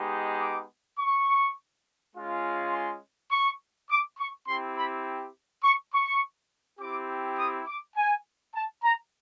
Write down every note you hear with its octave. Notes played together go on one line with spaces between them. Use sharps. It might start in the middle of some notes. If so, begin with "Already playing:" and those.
Already playing: G#3 B3 D#4 G4
D6
C#6
G#3 C#4 F4
C6
C#6
D6
C#6
C4 E4 G4 C6
B5
C#6
C#6
C4 E4 G4 D6
D#6
D6
G#5
A5
A#5